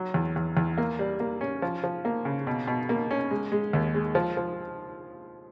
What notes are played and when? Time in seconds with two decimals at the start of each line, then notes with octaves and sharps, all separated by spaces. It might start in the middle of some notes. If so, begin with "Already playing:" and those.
Already playing: F#3
0.14 E2
0.36 E2
0.57 E2
0.78 A#3
0.99 G3
1.20 A#3
1.41 C#4
1.62 F3
1.84 F3
2.05 A#3
2.25 C#3
2.47 B2
2.67 B2
2.89 A#3
3.11 C#4
3.31 G#3
3.52 G#3
3.73 D#2
3.94 G#3
4.15 F3
4.37 F3